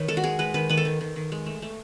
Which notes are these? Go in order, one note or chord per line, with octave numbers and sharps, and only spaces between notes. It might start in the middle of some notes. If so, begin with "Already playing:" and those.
Already playing: D#3 B4 C#5
G#3 A4
F#4
G#3 G#4
G#3 B4
D#3 B4
D#3 B4
A4
D#3
D#3
D#3
G#3
A3
A3